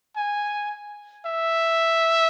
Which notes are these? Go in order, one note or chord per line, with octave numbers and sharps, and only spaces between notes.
G#5
E5